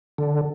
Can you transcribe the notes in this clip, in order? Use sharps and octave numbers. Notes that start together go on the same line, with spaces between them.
D3